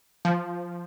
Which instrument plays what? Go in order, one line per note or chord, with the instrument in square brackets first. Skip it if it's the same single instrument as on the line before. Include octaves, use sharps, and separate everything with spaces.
[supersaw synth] F3